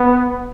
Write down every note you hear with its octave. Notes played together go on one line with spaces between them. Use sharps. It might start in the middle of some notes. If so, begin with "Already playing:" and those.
Already playing: B3